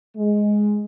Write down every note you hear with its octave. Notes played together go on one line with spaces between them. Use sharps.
G#3